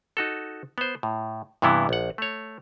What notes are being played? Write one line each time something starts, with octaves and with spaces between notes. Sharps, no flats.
D#4 F#4 A4
B3 C5
A2
G2 C3 E3 B3 E4
A#1 F#5
A3 C#5